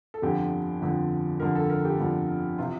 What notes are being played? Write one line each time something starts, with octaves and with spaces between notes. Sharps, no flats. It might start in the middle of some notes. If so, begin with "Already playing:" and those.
A4
G1 F2 D3 F3 G4
G1 F2 D3 F3
G1 F2 D3 F3 A#4
A4
A#4
G4
G1 F2 D3 F3
C3 E3 F4